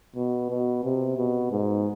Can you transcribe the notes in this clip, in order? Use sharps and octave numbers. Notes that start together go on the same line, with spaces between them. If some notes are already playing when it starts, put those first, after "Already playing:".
B2
B2
C3
B2
G#2